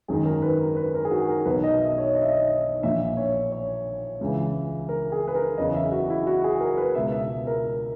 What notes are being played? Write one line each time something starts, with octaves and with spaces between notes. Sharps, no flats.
G#1 F#2 D#3 G#4
A#4
B4
A#4
B4
A#4
G#4
F#4
A#4
B1 B2 B4
D#5
E5
C#5
D#5
E5
D#5
A#1 A#2 E5
C#5
C#5
C#2 C#3 E3
A#4
G#4
B4
A#4
F#1 E2 C#3 D#5
E5
F#4
E4
F#4
G#4
A#4
B4
C#2 B2 E5
E5
A#4